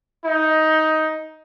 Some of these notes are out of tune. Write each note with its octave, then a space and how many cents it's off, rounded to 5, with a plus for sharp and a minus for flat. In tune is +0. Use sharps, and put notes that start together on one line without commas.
D#4 +10